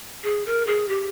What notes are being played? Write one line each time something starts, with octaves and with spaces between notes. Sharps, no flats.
G#4
A#4
G#4
G4